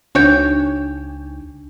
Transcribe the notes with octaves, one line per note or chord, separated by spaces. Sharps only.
C#2 D4 D#4 F#4 C#5 G5